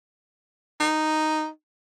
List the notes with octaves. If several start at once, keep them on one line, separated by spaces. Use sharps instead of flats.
D#4